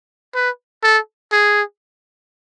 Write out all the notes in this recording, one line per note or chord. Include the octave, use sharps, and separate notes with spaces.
B4
A4
G#4